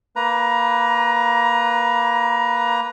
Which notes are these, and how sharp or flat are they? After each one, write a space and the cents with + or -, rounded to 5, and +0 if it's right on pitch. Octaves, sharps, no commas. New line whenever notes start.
A#3 +0 B4 +0 A#5 +20